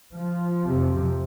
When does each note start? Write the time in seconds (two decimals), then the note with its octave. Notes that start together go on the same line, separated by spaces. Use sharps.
0.16 F3
0.64 F2 C3